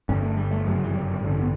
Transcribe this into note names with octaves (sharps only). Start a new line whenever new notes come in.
G1 G2 D3 C#4
A3
G3
A3
G1 F#2 C#3 A3
F#3
E3
G3
A1 G2 D3
C#4
B3